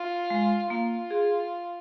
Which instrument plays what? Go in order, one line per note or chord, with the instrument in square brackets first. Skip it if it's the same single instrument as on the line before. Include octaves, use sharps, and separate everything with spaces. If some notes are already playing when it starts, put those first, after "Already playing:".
Already playing: [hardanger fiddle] F4
[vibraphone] G#3
[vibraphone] A#3 [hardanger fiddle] F4
[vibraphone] G#4